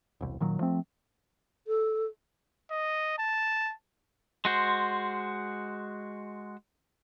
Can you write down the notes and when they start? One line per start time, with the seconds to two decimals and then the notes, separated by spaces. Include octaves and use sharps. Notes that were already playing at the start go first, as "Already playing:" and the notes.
0.21 E1 C2
0.40 A#2 D#3 F#3
0.59 F3 A3 C4
1.67 A4
2.71 D#5
3.19 A5
4.45 G#3 F#4 C5